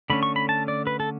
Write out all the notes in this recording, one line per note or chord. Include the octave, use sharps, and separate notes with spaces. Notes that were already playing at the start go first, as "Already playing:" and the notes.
D3 A3 C#4 B5
C#6
B5
A5
D5
B4
A4